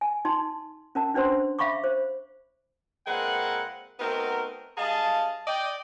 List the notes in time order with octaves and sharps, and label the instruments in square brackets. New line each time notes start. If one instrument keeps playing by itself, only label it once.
[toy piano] G#5
D#4 A5 C6
C#4 A#4 A5
C#4 D4 B4 C5 C6
E5 F5 B5 C#6 D6
C5
[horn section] A#2 G#3 C4 A#4 B4 F#5
A3 B3 C4 D#4 F#4 A#4
G2 G#4 D#5 F5 A5
D5 D#5 G5